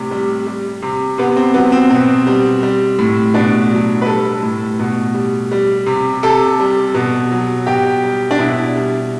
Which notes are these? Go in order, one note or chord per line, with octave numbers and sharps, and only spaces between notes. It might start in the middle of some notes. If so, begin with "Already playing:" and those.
Already playing: A2 C3 G3
G3
G3
C3
C3 B3
C4
F#3 B3
C4
B2
G3
G3
A2
B2 D4
F#3
B4
G3 A4
A2
B2
G3
G3
C3
C3 A4
G3
B2
F#3
B2 G4
G3
D4
B2 E4
G3